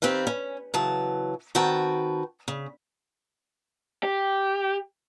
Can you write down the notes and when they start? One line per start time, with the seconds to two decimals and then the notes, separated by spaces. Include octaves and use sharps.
0.02 D#3 C4 G4 B4 F5
0.27 C#4
0.74 C#3 E3 F#3 A5
1.55 D#3 C4 F#4 B4 G5 A5
2.48 C#3
4.03 G4